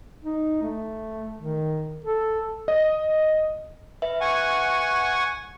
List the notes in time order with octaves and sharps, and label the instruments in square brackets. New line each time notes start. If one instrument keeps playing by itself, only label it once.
[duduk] D#4
A3
D#3
A4
[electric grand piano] D#5
[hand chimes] B4 E5
[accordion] F#5 G#5 C#6